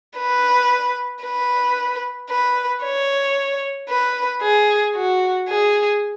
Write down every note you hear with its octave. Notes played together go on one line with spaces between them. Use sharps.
B4
B4
B4
C#5
B4
G#4
F#4
G#4